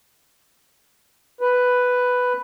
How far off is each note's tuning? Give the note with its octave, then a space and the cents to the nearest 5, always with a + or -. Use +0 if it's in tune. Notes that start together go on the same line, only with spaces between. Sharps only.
B4 +5